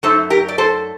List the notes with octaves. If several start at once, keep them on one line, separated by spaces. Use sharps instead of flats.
F#2 F#3 A3 D#4 A4 C5
G4 A#4
D5
A4 C5